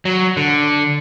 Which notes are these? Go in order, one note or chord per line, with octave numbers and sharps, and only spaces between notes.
F#3
D3